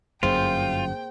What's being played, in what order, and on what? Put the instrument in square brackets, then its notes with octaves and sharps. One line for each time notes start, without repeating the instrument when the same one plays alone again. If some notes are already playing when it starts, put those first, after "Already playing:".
[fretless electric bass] G1 F#2 [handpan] A#3 G#4 C5 [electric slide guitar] F4 [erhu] G5